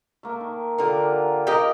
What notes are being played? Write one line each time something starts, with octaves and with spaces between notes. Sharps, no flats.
A3 A#3 A#4
D#3
D3 A#3 F4 G4 A#4
G4 A#4 D#5 F5